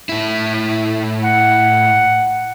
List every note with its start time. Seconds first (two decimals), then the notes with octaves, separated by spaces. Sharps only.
0.09 A2 E4
1.23 F#5